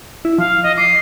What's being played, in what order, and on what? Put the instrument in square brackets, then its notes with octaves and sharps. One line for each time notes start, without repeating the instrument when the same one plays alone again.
[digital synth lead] E4
[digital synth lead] F3 [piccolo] F5
[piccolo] D#5
[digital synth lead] D6 [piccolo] C7